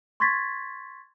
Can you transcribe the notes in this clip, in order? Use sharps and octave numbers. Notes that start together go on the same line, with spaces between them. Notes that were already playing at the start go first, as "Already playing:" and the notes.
C6 C#6 G#6 A6 B6